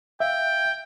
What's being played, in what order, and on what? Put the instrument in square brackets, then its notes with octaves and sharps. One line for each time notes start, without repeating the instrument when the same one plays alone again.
[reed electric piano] E5 F5 [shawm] G5